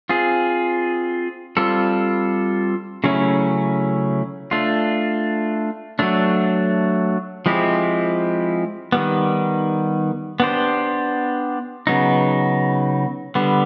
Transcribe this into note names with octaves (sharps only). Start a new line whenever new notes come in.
C4 F4 G#4
G3 C4 F4 A4
C#3 F#3 A3 C#4 E4
A3 D4 F4
F#3 A3 D4
F3 G#3 C4 E4 G4
D#3 G3 B3
B3 D4 G4 C5
C#3 F#3 B3 D#4
D3 G3 B3